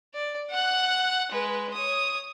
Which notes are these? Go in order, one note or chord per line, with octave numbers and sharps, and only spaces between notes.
D5
F#5 F#6
G#3 B4
C#5 D#6